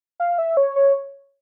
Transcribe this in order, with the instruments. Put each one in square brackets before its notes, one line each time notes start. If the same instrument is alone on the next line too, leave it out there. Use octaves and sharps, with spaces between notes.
[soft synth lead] F5
E5
C#5
C#5